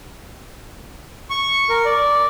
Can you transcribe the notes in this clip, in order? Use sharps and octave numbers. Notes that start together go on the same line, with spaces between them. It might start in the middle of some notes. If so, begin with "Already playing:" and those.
C#6
A#4
D5